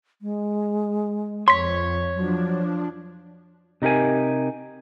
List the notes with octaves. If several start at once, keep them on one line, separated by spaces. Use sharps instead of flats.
G#3
F2 C#5 C6 B6
F3 F#3 D4
C3 D#4 G4 A#4 G#5